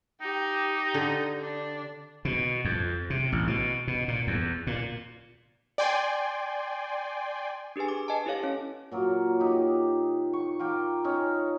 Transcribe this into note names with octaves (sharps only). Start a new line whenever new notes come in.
D#4 G4
D3
D4
B2
F2
C3
A1
B2
B2
A#2
E2
A#2
D5 G5 G#5 C6
D4 G4 G#4 B4 G#5
D6
B4 D#5 G#5 A5
E4 G4 A4 C#5 F5
C#4
A#2 F#3 A#4
D#4 G4
C#6
F4 A#4 G5 D6
C#4 D#4